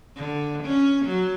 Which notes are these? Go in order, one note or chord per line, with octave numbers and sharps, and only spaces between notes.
D3
C#4
F#3